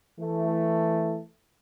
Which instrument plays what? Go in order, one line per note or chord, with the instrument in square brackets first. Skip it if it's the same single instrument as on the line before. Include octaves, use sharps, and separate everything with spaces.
[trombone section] E3 A3